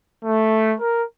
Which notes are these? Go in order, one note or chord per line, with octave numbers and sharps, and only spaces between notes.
A3
A#4